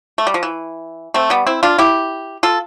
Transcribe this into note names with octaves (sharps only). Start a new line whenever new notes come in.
A3
G3
F3
E3
A3 C4
G3 B3
C4 E4
D4 F4
E4 G4
F4 A4